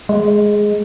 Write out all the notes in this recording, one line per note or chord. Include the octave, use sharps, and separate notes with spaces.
G#3